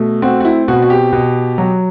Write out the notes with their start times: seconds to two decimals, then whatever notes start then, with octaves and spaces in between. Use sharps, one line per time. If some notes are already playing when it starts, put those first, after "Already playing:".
Already playing: B2 A3
0.22 C4 F#4
0.40 F#4
0.45 E4
0.68 B2 F#4
0.82 F#4
0.90 G4
1.12 B2
1.58 F#3